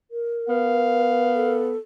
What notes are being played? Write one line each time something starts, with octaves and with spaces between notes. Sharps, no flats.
A#4
B3 F5
A4